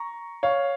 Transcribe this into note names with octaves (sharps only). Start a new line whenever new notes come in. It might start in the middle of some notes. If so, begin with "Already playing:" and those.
Already playing: A#5 C#6
C#5 F5